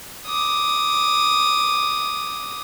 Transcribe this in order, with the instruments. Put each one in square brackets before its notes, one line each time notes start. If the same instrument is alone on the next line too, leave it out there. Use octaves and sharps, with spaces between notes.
[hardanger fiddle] D6 D#6